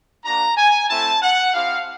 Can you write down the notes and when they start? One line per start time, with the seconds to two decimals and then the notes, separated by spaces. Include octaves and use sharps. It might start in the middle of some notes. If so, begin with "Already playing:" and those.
0.24 A#3 D4 F#4 A#5
0.57 G#5
0.89 A3 C4 E4 A5
1.22 F#5
1.53 C4 E4 G4 F5